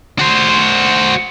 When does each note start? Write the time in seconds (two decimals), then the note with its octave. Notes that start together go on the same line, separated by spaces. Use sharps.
0.19 F#4 C5